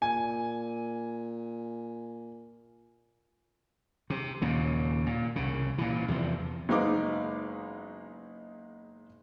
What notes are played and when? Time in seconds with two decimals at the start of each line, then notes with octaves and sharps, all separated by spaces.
0.02 A#2 G#5
4.10 C3
4.42 D#2 A#2 C#3
5.06 A#2
5.36 C2 C#3
5.78 A#2 E3
6.08 E2 C3 E3 F3
6.69 F#1 G#3 B3 D#4 F5 D6